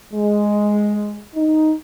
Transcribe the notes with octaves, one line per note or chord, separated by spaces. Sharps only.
G#3
D#4